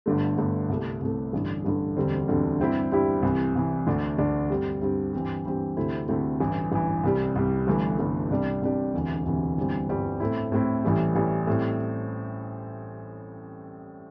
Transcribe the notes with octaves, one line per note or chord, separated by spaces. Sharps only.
G1 G2 D3 A3
G1 G2 D3 A3
C2 C3 A3
C2 C3 A3
A1 G2 D3
A1 G2 D3
E1 D2 D3 G3 C4
E1 D2 D3 G3 C4
G2 G3 C4 E4 G4
G2 G3 C4 E4 G4
C2 C3 E3
C2 C3 E3
D2 D3 A3 D4
D2 D3 A3 D4
G2 G3 C4 G4
G2 G3 C4 G4
G2 E3 C4 G4
G2 E3 C4 G4
D2 C3 A3 C4 E4
D2 C3 A3 C4 E4
A1 G2 E3
A1 G2 E3
C2 C3 G3
C2 C3 G3
G1 G2 E3 A3
G1 G2 E3 A3
C2 C3 G3 D4 G4
C2 C3 G3 D4 G4
E1 D2 C3 E3
E1 D2 C3 E3
G1 G2 E3 G3 C4
G1 G2 E3 G3 C4
A2 A3 C4 E4
A2 A3 C4 E4
A1 A2 E3 G3
A1 A2 E3 G3
A2 G3 C4